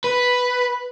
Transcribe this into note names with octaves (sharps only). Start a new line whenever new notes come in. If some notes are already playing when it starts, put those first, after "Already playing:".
B4